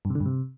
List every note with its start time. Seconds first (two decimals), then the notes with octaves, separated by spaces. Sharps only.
0.05 G2
0.10 C3
0.15 D3
0.20 G2
0.26 C3